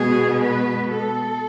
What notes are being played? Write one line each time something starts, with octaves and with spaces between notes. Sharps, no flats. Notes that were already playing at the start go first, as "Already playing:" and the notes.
Already playing: B2 G#3 B3 G#4
B4
A4